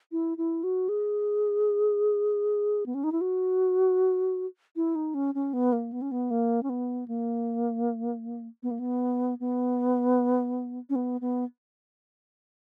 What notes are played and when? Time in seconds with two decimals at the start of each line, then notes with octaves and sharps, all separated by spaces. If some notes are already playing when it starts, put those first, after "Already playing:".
0.12 E4
0.38 E4
0.63 F#4
0.89 G#4
2.86 B3
2.94 C#4
3.04 D#4
3.12 E4
3.21 F#4
4.76 E4
4.95 D#4
5.14 C#4
5.35 C#4
5.53 B3
5.72 A#3
5.92 B3
6.02 C#4
6.11 B3
6.31 A#3
6.63 C#4
6.69 B3
7.08 A#3
8.63 B3
8.71 A#3
8.79 B3
9.40 B3
10.90 C#4
10.95 B3
11.21 B3